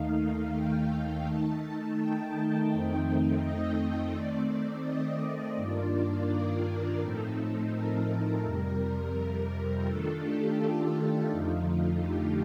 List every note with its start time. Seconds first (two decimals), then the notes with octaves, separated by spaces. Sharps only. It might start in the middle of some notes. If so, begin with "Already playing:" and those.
Already playing: D#2 D#3 A3 D#4 F5
0.55 G5
0.90 G5
1.26 D#3 A3 D#4 A5
1.97 G5
2.70 F2 D#3 A3 C4 D#4
3.41 D#5
3.76 D#5
4.13 D#3 A3 C4 D5
4.84 D#5
5.56 G2 D#3 A#3 D4 F4 D5
6.27 A#4
7.00 A2 F3 A3 C4 D#4 A4
7.71 A#4
8.43 F2 C3 G3 A#4
9.86 D#3 A3 D4 F4 A4
10.22 G4
10.58 F4
11.29 F2 D3 F3 A3 D#4 F4
12.01 G4